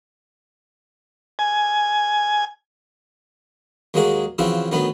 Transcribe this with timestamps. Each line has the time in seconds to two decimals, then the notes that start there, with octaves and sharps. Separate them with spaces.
1.39 G#5
3.94 D#2 F#3 G#3 A#3 F#4 G#4
4.38 C#3 E3 F3 C4 E4 F#4
4.72 D2 D#3 F#3 B3 B5